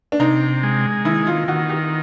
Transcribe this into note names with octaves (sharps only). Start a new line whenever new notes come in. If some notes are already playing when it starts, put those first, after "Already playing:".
D4
C3 D#4
G#3
D#3 E4
F4
D#3 F#4
G4